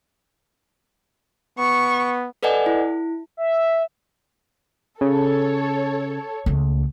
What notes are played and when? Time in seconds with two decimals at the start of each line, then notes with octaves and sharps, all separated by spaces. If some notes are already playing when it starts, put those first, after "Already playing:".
1.59 B3 C#6
2.43 A4 B4 D5 D#5 F#5 G#5
2.66 E4
3.37 E5
5.01 C#3 A4 C#5
6.46 C#2 A3